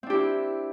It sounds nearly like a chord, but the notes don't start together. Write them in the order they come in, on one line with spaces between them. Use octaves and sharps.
C4 D4 G4 E4